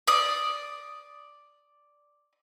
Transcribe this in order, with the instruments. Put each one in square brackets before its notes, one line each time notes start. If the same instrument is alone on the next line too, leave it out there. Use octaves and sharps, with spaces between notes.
[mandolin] D5 D#6